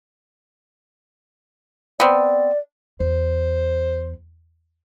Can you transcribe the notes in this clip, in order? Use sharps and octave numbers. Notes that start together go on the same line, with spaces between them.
B3 C4 D5
E2 C5